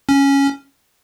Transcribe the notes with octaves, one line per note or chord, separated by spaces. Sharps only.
C#4